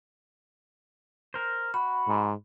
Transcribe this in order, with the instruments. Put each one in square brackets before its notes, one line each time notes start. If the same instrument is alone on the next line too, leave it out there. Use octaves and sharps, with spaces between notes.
[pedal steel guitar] A#4 C5
[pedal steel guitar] F#4 [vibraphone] B5
[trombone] G#2